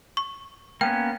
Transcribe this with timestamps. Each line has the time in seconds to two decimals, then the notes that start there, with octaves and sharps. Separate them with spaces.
0.17 C#6
0.81 A#3 B3 C#4 G5